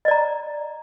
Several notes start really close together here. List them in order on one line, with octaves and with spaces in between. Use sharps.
D#5 D5 A#5